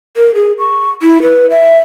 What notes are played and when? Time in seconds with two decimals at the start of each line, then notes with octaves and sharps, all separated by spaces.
0.17 A#4
0.35 G#4
0.59 C#6
1.02 E4
1.22 B4
1.50 E5